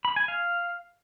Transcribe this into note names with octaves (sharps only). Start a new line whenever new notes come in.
B5
G#5
F5